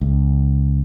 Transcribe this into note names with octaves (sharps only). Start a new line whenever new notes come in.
C#2